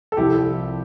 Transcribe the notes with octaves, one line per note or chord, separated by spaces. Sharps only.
A4
C2 C3 F3 E4 G4